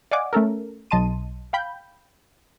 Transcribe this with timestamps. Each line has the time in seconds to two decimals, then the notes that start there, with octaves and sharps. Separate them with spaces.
0.11 D5 D#5 F5 F#5 G#5 D6
0.33 A3 C#4 A4 A#4
0.91 B1 D#5 A5 C6 D#7
1.53 F5 G5 B5 G6